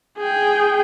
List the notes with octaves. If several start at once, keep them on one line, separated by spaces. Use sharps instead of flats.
G#4 G5